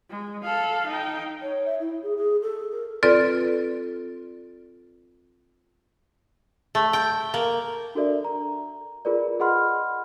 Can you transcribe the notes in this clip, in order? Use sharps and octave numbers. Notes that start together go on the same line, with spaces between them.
G#3
A4 F5
D#4 G5
C#5
E5
E4
G#4
G#4
A4
A#4
C4 F4 A4 B4 D5
A3
G5
A#3
D4 F#4 A4 A#4 D5 E5
A#5
F4 G#4 A#4 B4 D5
G#4 D#5 F#5 B5 C6 F6